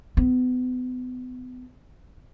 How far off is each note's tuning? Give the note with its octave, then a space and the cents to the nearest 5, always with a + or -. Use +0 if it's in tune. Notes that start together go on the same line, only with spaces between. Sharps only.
B3 +35